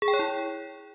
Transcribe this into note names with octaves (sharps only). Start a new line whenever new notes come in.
G#4
G5
C#5
E4